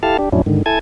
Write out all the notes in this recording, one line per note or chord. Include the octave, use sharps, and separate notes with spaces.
E4 G4 A4 F5 A5 F6
D4 G4
F2 A2 F#3 C#4 D4 E4
G#2 D3 D#3
E4 A4 G#5 A5 G#6